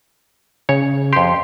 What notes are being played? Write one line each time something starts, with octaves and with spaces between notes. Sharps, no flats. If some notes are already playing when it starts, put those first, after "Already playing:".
C#3 C#5
F2 G4 C6